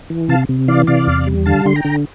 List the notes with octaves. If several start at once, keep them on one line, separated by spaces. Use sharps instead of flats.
E3
C3 F5 A5
C3
E3 D5 F5
C3 D5 F5
E2
G3
D3 F5 A5
D3 C6
G5 A#5
D3